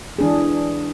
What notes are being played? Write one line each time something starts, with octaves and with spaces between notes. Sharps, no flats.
E3 D4 G#4